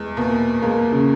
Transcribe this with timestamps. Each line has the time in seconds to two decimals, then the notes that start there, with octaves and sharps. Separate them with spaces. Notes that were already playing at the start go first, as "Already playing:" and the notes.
Already playing: E2 G#3
0.17 B2 A#3
0.62 G#3 A#3
0.92 C#3